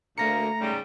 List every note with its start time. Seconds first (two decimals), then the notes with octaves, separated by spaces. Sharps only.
0.18 D2 A3 A#3 A#5 A#6 C#7
0.60 G#2 C#3 G3